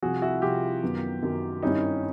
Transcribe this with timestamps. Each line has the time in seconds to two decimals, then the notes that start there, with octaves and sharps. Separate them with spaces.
0.02 C2 C3 F3 F#4 G#4
0.22 E4 F#4
0.42 C2 C3 F3 F4 G4
0.83 F#2 D#3 F#3 B3
1.22 F#2 D#3 F#3 B3
1.62 G2 D#3 G3 C4 C#4 D#4 E4